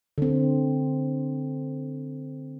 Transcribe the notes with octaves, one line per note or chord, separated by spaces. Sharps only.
D3 C4